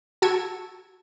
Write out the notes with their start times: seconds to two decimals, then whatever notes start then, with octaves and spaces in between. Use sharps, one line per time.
0.22 F#4 A5 E6 G#6 C#7